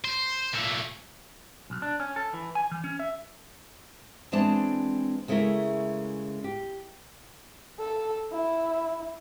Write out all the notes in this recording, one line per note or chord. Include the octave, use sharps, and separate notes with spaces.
C5
A#2 A3
B1
D4
C#4
A4
E3
G#5
E3
C#4
E5
E3 G#3 C4 D4 A5
C#3 G#3 A3 C#4 E4 A#4
G4
A4
E4